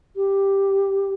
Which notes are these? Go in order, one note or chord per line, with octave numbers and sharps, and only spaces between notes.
G4